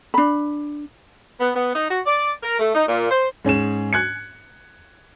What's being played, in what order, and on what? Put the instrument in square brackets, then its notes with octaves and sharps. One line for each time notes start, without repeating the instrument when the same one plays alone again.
[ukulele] D4 B5
[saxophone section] B3
B3
D#4
F#4
D5
A#4
A3
D#4
A#2
C5
[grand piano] G#2 C#4 G#4 E7
F#6 G#6 C#7